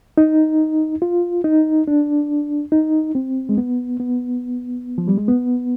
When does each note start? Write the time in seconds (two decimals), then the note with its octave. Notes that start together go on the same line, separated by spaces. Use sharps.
0.18 D#4
1.02 F4
1.44 D#4
1.88 D4
2.72 D#4
3.15 C4
3.49 G#3
3.58 B3
4.00 B3
4.98 F3
5.08 G3
5.18 G#3
5.28 B3